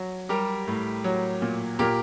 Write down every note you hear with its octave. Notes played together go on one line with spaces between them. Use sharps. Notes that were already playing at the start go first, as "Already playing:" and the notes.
Already playing: F#3
G3 G4 A#4
A2
F#3
A#2
A#2 G4 A#4